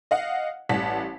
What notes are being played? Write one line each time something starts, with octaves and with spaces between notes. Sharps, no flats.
D#5 F5 F#5
A1 G3 F#5 A5 B6